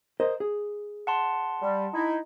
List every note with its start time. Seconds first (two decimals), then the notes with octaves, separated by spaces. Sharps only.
0.20 A#4 C5 D#5
0.40 G#4
1.07 F#5 A5 C6
1.62 G3
1.94 D#4 E4